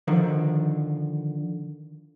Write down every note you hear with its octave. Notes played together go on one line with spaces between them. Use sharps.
D3 D#3 F3